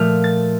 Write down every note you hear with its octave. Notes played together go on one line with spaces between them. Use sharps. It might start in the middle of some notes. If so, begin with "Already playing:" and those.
Already playing: A#2 F3 A3 F6
A6